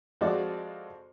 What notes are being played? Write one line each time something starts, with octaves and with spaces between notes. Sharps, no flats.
F2 G#3 F#4 D5 D6